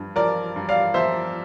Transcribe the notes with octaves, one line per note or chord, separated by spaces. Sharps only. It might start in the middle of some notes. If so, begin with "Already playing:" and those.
Already playing: G2 F3
F3 A#4 D5
G2
D5 F5
F3 C5 E5